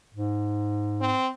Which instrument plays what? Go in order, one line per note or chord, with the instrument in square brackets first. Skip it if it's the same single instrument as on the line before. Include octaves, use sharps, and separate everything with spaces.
[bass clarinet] G#2
[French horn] C4